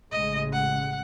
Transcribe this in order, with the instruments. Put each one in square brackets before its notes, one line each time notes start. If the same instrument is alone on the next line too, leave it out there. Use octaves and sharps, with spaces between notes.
[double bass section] A1 C#3 G#3 [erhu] D#5
[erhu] F#5